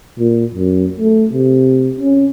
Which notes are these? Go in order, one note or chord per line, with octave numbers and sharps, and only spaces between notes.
A#2
F#2
A3
C3
C#4